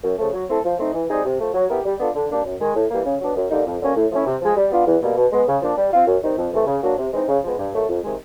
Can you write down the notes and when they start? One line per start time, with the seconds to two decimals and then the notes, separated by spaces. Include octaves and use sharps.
0.03 F#2
0.19 C#3 F3 A3
0.34 F#3
0.49 A3 C4 E4 A4
0.64 F3
0.79 A3 C4 D#4
0.94 E3
1.10 G3 C4 D#4 G#4
1.25 C3
1.39 F3 A3
1.54 F#3
1.70 B3 E4 G4 A#4
1.85 G3
2.00 B3 D4 F4 A4
2.15 D3
2.31 G3 A#3 D4
2.45 F#2
2.60 D#3 G#3
2.76 A2
2.90 E3 G3 A#3
3.06 C#3
3.20 F#3 B3 D4
3.36 F#2
3.51 D3 G3 A#3 D#4
3.66 F2
3.81 D3 F#3 A#3 C#4
3.96 A2
4.11 F3 A3 C#4 E4
4.26 C3
4.42 F3 G#3
4.56 G3
4.72 B3 D4 F4
4.87 E2
5.02 B2 G3 A#3
5.16 B2
5.32 G#3 B3
5.47 C#3
5.62 F3 A#3 D4
5.78 G3
5.92 C4 F4
6.07 F#2
6.23 D#3 G3 C4 D#4
6.38 F2
6.53 C3 E3 A3
6.67 C#3
6.83 F#3 A#3 D4 F#4
6.98 C3
7.13 E3 G#3 C4 D#4
7.29 C#3
7.43 F3 G#3 B3
7.58 G2
7.73 D#3 F#3 A3
7.89 F2
8.03 C3 D#3 G#3